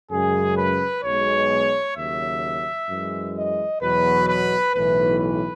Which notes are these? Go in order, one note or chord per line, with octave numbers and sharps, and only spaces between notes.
F#2 C#3 G#3 G#4
B4
B1 B2 G#3 C#5
D#2 C#3 F#3 E5
F#2 E3 G#3
D#5
E2 B2 F#3 B4
B4
B1 A2 E3 B4
B4